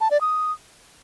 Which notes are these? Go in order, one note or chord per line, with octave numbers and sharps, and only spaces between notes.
A5
D5
D#6